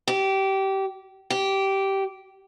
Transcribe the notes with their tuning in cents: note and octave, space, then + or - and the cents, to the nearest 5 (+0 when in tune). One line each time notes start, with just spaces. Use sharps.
G4 -20
G4 -15